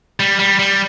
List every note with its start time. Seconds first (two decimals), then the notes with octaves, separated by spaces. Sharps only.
0.20 G3
0.39 G3
0.59 G3